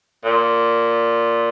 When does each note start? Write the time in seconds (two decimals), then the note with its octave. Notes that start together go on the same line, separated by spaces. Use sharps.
0.24 A#2